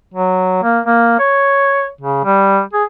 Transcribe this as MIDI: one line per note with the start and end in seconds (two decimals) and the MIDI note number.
0.14 0.58 54
0.63 0.80 58
0.86 1.17 58
1.20 1.88 73
2.01 2.23 49
2.24 2.61 55
2.73 2.84 68